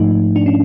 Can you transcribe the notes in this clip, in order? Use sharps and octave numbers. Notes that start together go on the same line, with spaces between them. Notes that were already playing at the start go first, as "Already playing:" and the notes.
Already playing: G#2 F3 A3 D#4
D4
C#4